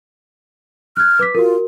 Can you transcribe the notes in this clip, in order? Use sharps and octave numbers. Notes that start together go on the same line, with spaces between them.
F6 F#6 G#6
B4 D6 B6
F4 F#4 A#4